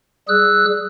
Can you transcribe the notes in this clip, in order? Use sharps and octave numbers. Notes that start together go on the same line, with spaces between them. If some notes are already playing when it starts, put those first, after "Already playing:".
G3 G#4 E6 F#6